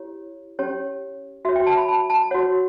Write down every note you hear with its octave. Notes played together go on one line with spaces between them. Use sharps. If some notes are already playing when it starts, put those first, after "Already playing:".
Already playing: E4 G4 C#5
C#4 G4 C#5
F#4 C#5 E5
G5
A5
B5
A5
A5
F#4 C#5 F#5